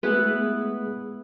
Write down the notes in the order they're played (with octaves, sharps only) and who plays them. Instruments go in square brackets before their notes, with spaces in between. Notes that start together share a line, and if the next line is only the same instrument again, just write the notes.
[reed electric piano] G#3 A3 G#4 [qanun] B3 E4 B4